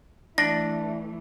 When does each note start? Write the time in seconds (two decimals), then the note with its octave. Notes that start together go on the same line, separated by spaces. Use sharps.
0.38 E3 A3 D4 A#6